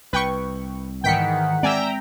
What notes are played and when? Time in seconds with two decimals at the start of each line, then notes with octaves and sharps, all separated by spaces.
0.13 C2 B4 G5 C#6
1.04 G#2 D#3 E3 F#5 G5 B6 C#7
1.63 G#3 C4 D5 E5 G5 G#5 A#5 E6